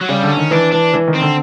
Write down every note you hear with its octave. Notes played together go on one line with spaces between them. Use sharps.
F#3
C#3 G3
D3
C#4
D#3
E3 D4
E3 D4
E3
D#3
C4
D3